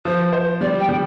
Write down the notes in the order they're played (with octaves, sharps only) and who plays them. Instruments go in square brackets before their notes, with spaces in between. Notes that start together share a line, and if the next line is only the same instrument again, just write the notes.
[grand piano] F3 [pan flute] C5
[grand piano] C5
[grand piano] G3 [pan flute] D5
[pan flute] G5
[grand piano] G3